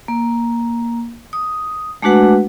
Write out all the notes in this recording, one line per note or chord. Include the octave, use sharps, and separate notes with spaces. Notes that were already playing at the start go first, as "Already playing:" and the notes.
A#3
D#6
G#3 A3 D4 F#4 B4 F#5